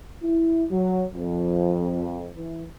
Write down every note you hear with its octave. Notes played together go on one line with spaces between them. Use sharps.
E4
F#3
F2
E3